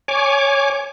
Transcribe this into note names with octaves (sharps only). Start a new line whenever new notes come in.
C#5 G#5 D6